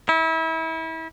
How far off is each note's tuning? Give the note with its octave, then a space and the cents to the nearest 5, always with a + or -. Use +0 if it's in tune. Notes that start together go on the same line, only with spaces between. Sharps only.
E4 -30